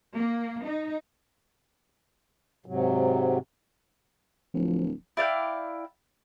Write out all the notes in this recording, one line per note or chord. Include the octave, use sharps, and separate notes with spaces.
A#3
D#4
G#2 C3 F#3
D1 F3
E4 D5 F5 G5